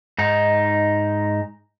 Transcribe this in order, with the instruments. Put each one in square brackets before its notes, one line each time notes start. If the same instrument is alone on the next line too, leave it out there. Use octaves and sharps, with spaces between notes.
[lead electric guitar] G#2 D#4